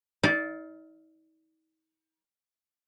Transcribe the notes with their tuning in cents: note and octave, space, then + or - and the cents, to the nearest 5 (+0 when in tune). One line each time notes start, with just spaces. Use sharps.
D#4 +45 D5 -10 F5 +0